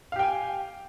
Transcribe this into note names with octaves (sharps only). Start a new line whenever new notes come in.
G4 F5 G5 G#5